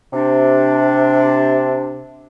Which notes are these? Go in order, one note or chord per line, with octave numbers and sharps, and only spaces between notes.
C3 D4